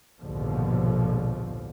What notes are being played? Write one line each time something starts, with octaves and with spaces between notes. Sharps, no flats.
A#1 D#2 G#2 B2 D3 F3